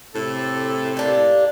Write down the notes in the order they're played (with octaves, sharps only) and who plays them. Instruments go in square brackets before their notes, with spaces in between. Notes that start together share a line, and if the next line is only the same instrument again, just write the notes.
[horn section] A2 C3 A4
[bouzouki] A#3 D4 G4